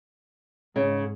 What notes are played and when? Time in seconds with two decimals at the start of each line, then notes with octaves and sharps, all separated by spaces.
0.76 G#2 C#3